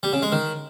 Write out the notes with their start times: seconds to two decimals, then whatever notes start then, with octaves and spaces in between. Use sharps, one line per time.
0.03 G3
0.13 C#3
0.22 G#3
0.32 D#3